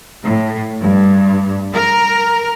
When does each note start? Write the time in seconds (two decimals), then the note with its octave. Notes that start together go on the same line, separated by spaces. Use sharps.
0.24 A2
0.83 G2
1.73 A#4